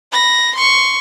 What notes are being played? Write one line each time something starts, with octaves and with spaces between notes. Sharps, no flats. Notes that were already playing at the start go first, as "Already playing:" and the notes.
B5 A#6
C6 C#6